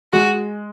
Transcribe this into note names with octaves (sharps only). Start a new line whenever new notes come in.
G#3 F#4